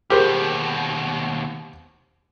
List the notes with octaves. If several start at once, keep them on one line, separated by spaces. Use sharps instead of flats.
D#2 B2 G4 G#4 A#4 C5